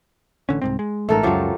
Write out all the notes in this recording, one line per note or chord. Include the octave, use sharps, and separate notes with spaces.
A1 D3 C#4
C2 G#2 C4
G#3
A1 G#2 A3 A4 A#4
C#2 F#2 F3 F#3 G4